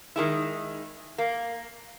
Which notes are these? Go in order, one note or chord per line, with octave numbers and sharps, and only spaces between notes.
D#3 G#3 E4
A#3